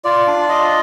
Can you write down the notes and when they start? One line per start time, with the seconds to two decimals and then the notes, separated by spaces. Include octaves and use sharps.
0.05 F4 D5
0.27 D4
0.49 F4 D#5